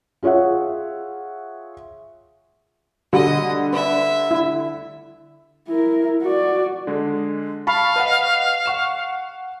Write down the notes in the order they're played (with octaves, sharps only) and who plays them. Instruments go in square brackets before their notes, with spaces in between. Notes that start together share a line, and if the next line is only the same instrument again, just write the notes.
[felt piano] F4 G#4 C#5 E5 F#5
[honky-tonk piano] D3 G3 [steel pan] F#4 [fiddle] D#5
[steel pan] D4 B4 [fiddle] E5
[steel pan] E4
[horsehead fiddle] E4 A#4
F#4 D5
[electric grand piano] D3 G#3
[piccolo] F5 [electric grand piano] A5 B5 C#6
[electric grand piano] B4 D#5 F#5
F#5 C#6 E7